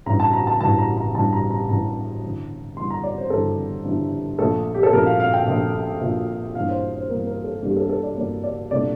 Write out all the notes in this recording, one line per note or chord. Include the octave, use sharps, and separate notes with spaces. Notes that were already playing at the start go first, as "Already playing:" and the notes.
A1 G2 E3 A#5
A5
A#5
A5
A1 G2 E3 A5
A#5
A#5
A1 G2 E3 A5
A#5
A#5
A1 G2 E3 A#5
G1 G2 E3
G1 G2 E3 C6
A#5
D5
C5
G1 G2 E3 A4
G1 G2 E3
A#1 A#2 A3 A4
G4
A4
A#1 A#2 A3 A#4
F5
F5
G5
A#1 A#2 A3
A#1 A#2 A3
G2 E3 A#3 D4 F5
C5
C5
G2 E3 A#3 D4 A#4
A#4
A4
G2 E3 A#3 D4 G4
A4
A4
D5
G2 E3 A#3 D4 D5
D5
C2 A#2 A3 D4 D5